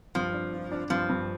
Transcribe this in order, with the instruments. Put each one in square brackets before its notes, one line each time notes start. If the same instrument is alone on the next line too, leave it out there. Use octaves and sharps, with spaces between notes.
[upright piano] G2 [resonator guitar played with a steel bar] F3
[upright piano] D4
F4
D4
[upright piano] G2 [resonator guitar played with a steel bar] F3
[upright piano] G2